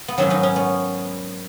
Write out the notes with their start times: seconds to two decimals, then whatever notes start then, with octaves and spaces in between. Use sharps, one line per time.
0.08 B3
0.18 G#2 D#3 F#3 C#4
0.30 B3 D#4
0.43 C#4
0.56 B3